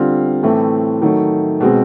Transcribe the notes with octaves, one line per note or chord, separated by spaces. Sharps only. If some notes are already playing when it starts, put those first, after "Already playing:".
Already playing: D3 G3 C4 F4
A2 E3 A3 C4
D#3 F#3 A3
B2 G#3 C4